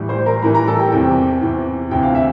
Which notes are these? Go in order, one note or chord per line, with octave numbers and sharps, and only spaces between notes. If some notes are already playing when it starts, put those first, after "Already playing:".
Already playing: A2 E3 G3
C5 C6
A#4 A#5
A2 E3 G3 A#4 A#5
A#4 A#5
A4 A5
G4 G5
E2 C3 E3 G4 G5
E2 C3 E3
D2 C3 E3 G5
F5
E5